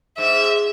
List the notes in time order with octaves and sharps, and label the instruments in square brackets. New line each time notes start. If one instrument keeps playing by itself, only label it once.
[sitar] G#2 [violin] E5